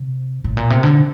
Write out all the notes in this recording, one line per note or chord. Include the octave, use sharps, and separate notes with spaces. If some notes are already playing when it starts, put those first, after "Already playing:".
Already playing: C3
A2
A#2
C3
D3